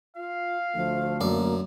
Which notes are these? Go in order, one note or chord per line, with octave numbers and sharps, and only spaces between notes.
F4 F5
D2 F3 A3
F#2 A#3 D5